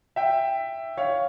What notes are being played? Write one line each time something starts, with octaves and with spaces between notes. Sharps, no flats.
E5 G5
C#5 F5